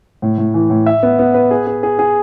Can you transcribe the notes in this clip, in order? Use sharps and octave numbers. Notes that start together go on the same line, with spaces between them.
A2
A2
E3
A2
E5
B3
B3
B4
G#4
G#4
G#4
G#4